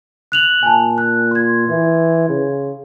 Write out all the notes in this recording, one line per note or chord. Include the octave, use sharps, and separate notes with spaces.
F#6 F7 F#7
A#2 G#5 A5
F#6
C6 G#6
E3
C#3